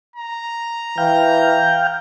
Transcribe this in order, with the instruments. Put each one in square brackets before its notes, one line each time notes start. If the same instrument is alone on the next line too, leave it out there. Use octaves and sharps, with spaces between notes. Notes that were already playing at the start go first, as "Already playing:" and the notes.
[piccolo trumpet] A#5
[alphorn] E3 [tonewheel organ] F5 G5